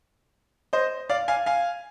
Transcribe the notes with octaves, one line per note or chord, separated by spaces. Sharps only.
C5 D#5
D5 F5
F5 G#5
F5 G#5